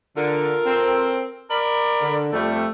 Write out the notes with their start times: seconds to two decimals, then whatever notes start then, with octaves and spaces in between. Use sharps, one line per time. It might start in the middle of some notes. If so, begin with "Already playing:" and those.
0.17 D3 F4 A4 A#4
0.66 C4
1.51 A#4 D5 B5
2.01 D3
2.33 F2 G3 A3